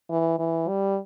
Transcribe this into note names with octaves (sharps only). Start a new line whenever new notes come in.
E3
E3
G3